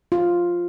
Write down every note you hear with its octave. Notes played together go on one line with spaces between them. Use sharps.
F4